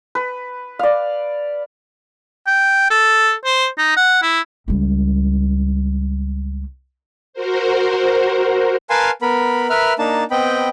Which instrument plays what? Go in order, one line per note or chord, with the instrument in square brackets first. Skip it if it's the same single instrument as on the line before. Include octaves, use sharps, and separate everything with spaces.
[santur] B4
D5 F5
[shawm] G5
A4
C5
D#4
F#5
E4
[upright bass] C#2 G3
[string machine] F#4 A#4 C5
[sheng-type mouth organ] A#4 B4 F5 G#5 A5 C6
B3 A#4 B5
A#4 B4 E5 B5 F6
A#3 D4 D#4 A5
B3 C4 D#5 G5 B5